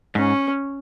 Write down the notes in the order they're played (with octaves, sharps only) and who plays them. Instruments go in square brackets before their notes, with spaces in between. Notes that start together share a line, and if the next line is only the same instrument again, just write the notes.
[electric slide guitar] G#2 [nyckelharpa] C#4